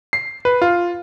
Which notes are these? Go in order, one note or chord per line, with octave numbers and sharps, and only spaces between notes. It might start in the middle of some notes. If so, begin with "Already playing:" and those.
C7
B4
F4